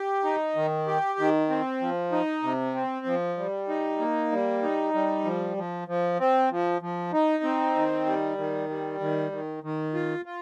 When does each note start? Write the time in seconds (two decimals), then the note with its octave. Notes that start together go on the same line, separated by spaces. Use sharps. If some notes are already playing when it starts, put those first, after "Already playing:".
Already playing: G4
0.24 D#4
0.56 D#3
0.87 G4
1.19 D#3
1.49 C4
1.81 F3
2.12 D#4
2.43 C3
2.75 C4
3.06 F3
3.38 G3
3.68 D#4
3.99 A#3
4.32 G3
4.63 D#4
4.94 G3
5.25 F3
5.57 F3
5.88 F3
6.20 C4
6.51 F3
6.82 F3
7.13 D#4
7.43 C4
7.75 D#3
8.06 G3
8.38 D#3
8.69 G3
9.00 D#3
9.32 D#3
9.63 D#3
9.94 F4
10.25 F4